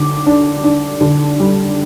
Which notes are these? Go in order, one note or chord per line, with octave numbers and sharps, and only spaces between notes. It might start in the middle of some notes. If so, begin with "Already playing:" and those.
Already playing: D3 D6
D4
D4
D3
G3